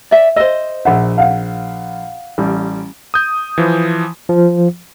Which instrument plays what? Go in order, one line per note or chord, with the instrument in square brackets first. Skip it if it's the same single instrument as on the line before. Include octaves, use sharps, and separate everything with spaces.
[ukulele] D5 E5
[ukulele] C5 D#5 [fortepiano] E6
[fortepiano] A#1 E5 [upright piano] F#5
[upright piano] F5 F#5
[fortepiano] A1 G3
[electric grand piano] D#6 G6
E3 F3
[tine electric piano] F3